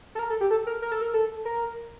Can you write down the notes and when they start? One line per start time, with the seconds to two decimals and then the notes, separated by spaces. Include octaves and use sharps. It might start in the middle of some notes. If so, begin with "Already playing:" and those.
0.15 A4
0.19 A#4
0.30 A4
0.41 G4
0.51 A4
0.67 A#4
0.82 A#4
0.92 A4
1.02 A#4
1.14 A4
1.45 A#4